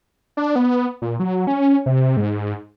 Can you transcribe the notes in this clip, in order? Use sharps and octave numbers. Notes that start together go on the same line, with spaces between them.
D4
B3
A#2
F#3
C#4
C3
G#2